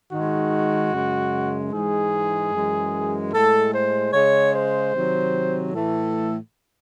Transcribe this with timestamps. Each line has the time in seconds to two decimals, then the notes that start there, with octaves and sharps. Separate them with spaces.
0.11 G#2 D#3 G#3 F#4
0.92 F#2 C#3 G#3
1.72 G#2 E3 G#3 G#4
2.52 F#2 E3 G#3
3.33 A2 G#3 A4
3.73 C5
4.13 C#3 G#3 C#5
4.53 C5
4.93 C3 D#3 F#3
5.73 A2 E3 A3 A4